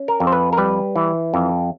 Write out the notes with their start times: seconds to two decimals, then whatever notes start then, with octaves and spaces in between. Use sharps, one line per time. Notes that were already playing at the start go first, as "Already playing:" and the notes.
Already playing: C#4
0.08 A#4
0.20 F2
0.27 C5
0.32 B4
0.53 A#4
0.57 G3 B4
0.96 E3
1.34 F2